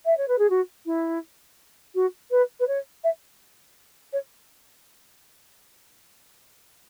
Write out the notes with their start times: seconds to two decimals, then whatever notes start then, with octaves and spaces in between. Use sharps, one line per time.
0.06 E5
0.18 C#5
0.28 B4
0.39 G#4
0.50 F#4
0.86 E4
1.95 F#4
2.31 B4
2.60 B4
2.68 C#5
3.04 E5
4.13 C#5